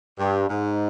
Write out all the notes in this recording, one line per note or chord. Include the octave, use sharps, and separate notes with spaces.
G2
G#2